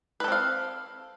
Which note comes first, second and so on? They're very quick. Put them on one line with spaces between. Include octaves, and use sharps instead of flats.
B4 A4 C4 F5